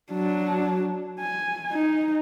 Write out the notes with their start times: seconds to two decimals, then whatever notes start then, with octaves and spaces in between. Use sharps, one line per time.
0.12 F#3 D4
1.20 G#5
1.72 D#4